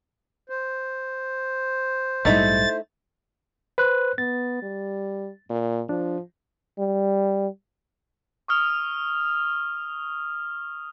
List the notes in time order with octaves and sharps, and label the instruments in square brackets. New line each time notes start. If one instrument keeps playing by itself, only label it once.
[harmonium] C5
[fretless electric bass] A#1 G#2 G3 [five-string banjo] A3 D#4 E4 [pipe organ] A6
[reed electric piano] B4 C5 F#6
[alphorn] B3 [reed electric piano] A6
[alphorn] G3
A#2
[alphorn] F3 [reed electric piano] D4
[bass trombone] G3
[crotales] C#6 D#6 F6 F7